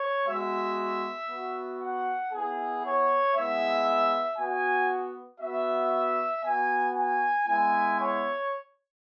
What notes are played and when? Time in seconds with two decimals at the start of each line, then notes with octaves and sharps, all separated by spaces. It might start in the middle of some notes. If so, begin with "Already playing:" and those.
Already playing: C#5
0.26 G#3 B3 F#4 E5
1.28 B3 F#4
1.79 F#5
2.31 B3 E4 G#4
2.83 C#5
3.34 G#3 B3 E4 E5
4.38 B3 F#4 G#5
5.40 B3 F#4 E5
6.44 B3 F#4 G#5
6.94 G#5
7.46 G#3 B3 E4 G#5
7.98 C#5